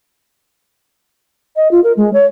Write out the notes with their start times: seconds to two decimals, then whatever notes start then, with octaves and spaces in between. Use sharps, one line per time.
1.56 D#5
1.71 F4
1.84 A#4
1.97 G#3
2.13 C#5